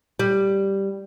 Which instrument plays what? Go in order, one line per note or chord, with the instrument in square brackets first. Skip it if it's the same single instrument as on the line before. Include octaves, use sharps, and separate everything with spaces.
[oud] G3